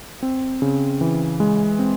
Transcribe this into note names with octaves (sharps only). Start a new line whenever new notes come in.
C4
C#3
E3
G#3
C4